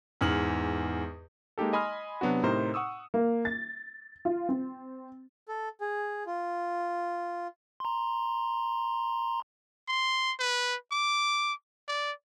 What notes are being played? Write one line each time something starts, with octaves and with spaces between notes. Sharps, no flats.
E2 G#2 F6 F#7
G#3 A#3 D#4 G4 A4
D#5 G#5 B5 C6 D#6 F6
C3 F#3 B3 D4 F#4
A2 C3 D#4 A#4 C5
F#5 C#6 D#6 E6
A#3
A6
F4
C4
A4
G#4
F4
A#5 C6
C6
B4
D6
D5